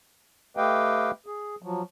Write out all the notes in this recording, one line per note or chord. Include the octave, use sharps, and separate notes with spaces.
A3 G4 B4 D#5 F5 G5
G#4
F3 F#3